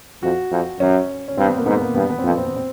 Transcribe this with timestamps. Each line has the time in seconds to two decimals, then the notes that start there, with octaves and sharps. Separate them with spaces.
0.23 F2 F#4
0.51 F2
0.80 F#2 C#4
1.28 C#4
1.38 G2 C4
1.46 B3
1.57 A#3
1.66 G#2 B3
1.81 A#3
1.94 G2 B3
2.10 B3
2.18 C4
2.24 F2
2.28 B3
2.37 C4
2.46 B3
2.56 C4